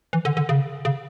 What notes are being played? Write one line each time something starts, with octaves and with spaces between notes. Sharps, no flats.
E3
D3
D3
C#3
C#3